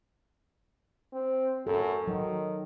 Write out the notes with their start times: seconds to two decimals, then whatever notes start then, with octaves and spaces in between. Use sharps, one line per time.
1.13 C4
1.67 F#2 A4
2.08 D#3 F#3